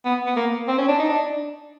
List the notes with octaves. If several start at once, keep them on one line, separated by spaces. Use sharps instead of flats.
B3
B3
A#3
C4
C#4
D4
D#4
D4